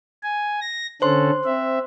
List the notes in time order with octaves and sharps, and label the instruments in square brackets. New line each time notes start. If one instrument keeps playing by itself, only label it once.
[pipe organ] G#5
A#6
[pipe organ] D3 C#4 A4 [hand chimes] C5 C6
[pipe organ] C4 E5